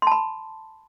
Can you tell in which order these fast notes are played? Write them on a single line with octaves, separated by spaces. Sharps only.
C6 A5 B5